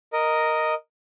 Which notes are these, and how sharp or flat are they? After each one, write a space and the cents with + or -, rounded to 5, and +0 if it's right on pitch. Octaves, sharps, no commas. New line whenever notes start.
A#4 +0 D#5 +0